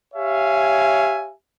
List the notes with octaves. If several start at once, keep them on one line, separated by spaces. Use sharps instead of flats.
G4 C#5 E5 F5 G#5